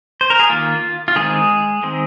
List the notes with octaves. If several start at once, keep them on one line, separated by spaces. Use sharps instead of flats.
C5
A#4
G#4
D#3 A#3 F4
F4
D#3 G#3 C4 G#4
D#3 G#3 C4